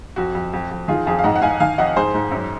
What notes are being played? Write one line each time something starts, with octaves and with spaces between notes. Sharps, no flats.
F2 F#4
F2
F2
F2
D#3 F4 G#4
F2 F4 G#4
F5
G#2 D#5 F#5
F#5
G#2 F5 G#5
D#3 F5 G#5
F2 D#5 F#5
G#2 G#4 C5
G#2
F#2